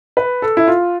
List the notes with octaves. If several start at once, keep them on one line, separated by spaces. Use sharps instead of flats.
B4
A4
E4
F4